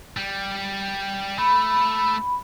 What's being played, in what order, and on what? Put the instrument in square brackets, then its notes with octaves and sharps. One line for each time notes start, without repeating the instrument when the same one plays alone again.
[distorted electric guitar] G3
[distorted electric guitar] A3 [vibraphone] B5